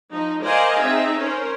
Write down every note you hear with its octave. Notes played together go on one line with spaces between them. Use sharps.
F3 D#4
A#4 C5 D5 D#5 F5 G#5
C4 D#4 G#4 E5
C#4 A#4 C5 C#5